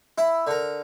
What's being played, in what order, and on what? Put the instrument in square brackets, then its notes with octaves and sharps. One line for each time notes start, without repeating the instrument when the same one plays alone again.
[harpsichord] E4 E5
D3 A#4